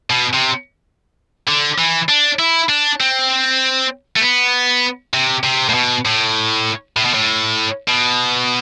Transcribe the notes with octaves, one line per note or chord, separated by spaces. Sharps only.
B2
C3
D3
E3
D4
E4
D4
C4
A3
B3
C3
C3
A2
B2
A2
A2
B2
A2
B2